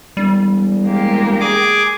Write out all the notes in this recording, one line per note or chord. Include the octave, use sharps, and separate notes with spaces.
E1 G3
G#3 A#3 G4
G#4 D6